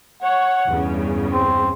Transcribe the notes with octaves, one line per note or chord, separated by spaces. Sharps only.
C#5 F#5
E2 G2 C#3
C4